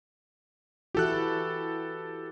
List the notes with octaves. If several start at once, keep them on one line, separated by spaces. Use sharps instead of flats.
E3 E4 F#4 G4 A4 F#6